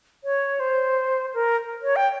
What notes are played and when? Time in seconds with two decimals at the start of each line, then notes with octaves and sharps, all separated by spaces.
0.24 C#5
0.60 C5
1.34 A#4
1.83 C#5
1.96 G5